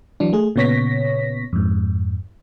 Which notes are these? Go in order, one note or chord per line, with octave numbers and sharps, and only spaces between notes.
E3 F#3 D4
A3 G#4
A#2 C#3 B3 C#5 A#6 B6
F2 G#2